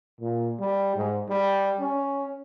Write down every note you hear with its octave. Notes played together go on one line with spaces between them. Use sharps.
A#2
G3
G#2
G3
C#4